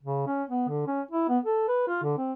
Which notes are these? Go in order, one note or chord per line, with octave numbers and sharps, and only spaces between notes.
C#3
C#4
B3
D3
C#4
E4
B3
A4
B4
F4
D3
C4